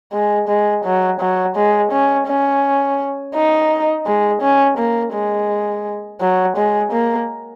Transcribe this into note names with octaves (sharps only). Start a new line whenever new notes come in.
G#3
G#3
F#3
F#3
G#3
C#4
C#4
D#4
G#3
C#4
A#3
G#3
F#3
G#3
A#3